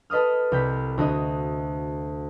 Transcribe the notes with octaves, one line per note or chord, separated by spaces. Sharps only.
A4 B4 D#5 D#6 F6
C2 G6 B6
D2 F#4 D#5 D#6